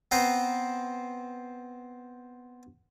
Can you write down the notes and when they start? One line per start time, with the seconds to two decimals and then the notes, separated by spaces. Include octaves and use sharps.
0.11 B3 C4 B4 C5 A#5